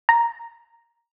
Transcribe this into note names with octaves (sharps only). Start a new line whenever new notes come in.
A#5